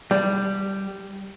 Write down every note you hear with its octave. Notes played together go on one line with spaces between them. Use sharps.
G3